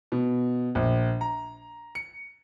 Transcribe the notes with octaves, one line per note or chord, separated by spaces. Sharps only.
B2
A#1
A#5
C#7